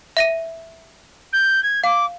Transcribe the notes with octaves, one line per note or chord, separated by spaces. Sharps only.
E5 A#6 D#7
G6
G#6
F5 D6